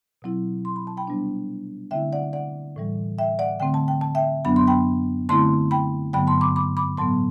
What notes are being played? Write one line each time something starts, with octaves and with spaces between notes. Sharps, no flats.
B2 F#3 C4 E4
C6
B5
A5
G5 B5
C3 G3 B3 D4
D3 A3 C4 E4 E5 G5
D5 F#5
D5 F#5
A2 E3 G3
E5 G5
D5 F#5
D3 A3 C4 G5
A5
G5
A5
E5 G5
F#2 F#3 B3 D4 B5
C6
G5 B5
D3 A3 C4 E4 A5 C6
G5 B5
G2 D3 F#3 B3 G5 B5
A5 C6
B5 D6
B5 D6
B5 D6
A2 F#3 B3 A5 C6